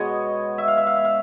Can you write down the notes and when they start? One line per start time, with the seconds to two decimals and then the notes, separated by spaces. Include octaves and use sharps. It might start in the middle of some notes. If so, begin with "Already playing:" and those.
Already playing: B2 G#3 B3 C#5 D#5
0.58 E5
0.68 F5
0.77 E5
0.87 F5
0.96 E5
1.05 F5